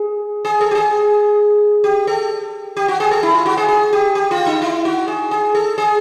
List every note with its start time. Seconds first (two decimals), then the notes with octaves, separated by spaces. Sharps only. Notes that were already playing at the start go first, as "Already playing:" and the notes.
Already playing: G#4
0.45 G#4
0.61 A4
0.71 G4
0.75 G#4
1.84 G4
2.07 A4
2.77 G4
2.88 F#4
3.00 G#4
3.11 A4
3.23 E4
3.35 F4
3.46 F#4
3.57 G#4
3.69 G#4
3.93 G4
4.15 G4
4.31 F4
4.46 D#4
4.62 E4
4.85 F#4
5.08 G#4
5.31 G#4
5.55 A4
5.78 G#4